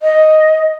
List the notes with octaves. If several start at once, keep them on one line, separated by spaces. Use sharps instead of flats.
D#5